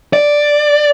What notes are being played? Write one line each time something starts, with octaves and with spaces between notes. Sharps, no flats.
D5